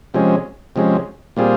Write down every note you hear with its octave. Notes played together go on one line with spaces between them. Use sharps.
C3 F3 G#3 C#4
C3 F3 G#3 C#4
A#2 G3 C4 F4 G#4